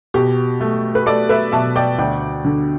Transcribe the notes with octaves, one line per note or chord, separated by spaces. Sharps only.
B2 G4
A3
B4
A3 A4 D5
B4 E5
B2 E5 A5
D5 G5
D2 D5 G5
D3